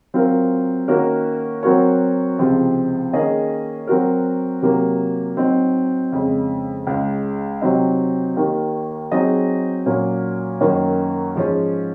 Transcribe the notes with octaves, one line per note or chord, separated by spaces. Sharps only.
F#3 C4 F4 A#4
D#3 A#3 C#4 F#4 A#4
F#3 C4 F#4 A#4 C#5
C#2 C3 F3 G#3 C4
D#3 A#3 C#4 G#4 D#5
F#3 C4 F#4 A#4
C3 F#3 A#3
F#3 C4 D#4
F2 C#3 G#3
C#2 C#3 G#3
C3 F#3 C4 D#4
D#2 D#3 A#3
F#3 C4 D#4 G#4 D#5
A#2 F#3 C#4
F#2 D#3 A#3 C#4
G#2 F3 G#3 C#4